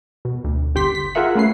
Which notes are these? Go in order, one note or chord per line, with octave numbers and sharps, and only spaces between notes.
B2
D2
G1 G4 C6 B6
B6
F4 G#4 A#4 E5 F#5
A3 C#4 B4 C7